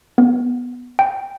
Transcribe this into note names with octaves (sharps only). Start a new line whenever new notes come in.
B3
G5